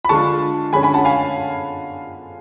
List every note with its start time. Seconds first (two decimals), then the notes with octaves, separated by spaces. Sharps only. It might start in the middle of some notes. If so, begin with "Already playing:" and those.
0.05 B5
0.09 D3 G#3 D4 F4 A5 C#6
0.73 D3 G#3 C#4 G#5 B5
0.83 G#5 B5
0.94 F#5 A5
1.05 F5 G#5